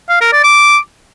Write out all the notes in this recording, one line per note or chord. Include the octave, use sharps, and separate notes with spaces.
F5
A#4
D5
D6